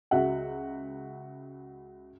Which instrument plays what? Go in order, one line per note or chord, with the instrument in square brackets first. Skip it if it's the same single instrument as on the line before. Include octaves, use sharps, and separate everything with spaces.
[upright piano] C#2 F#4 E5 F#5